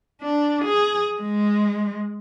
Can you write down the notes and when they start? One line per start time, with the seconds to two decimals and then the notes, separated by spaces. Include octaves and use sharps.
0.22 D4
0.65 G#4
1.21 G#3